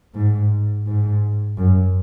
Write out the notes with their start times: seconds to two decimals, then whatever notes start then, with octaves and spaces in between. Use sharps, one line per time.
0.15 G#2
0.86 G#2
1.58 F#2